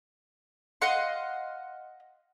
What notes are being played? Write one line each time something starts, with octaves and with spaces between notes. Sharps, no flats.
D#5 F5 F#5 C6